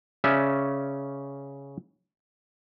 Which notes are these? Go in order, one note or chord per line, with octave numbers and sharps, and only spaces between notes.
C#3 C#4 D5 E5